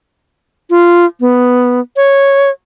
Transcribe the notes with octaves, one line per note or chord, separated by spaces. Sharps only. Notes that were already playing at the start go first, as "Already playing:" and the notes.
F4
B3
C#5